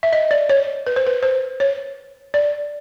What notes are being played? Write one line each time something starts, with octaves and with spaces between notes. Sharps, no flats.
E5
D#5
D5
C#5
B4
C5
B4
C5
C#5
D5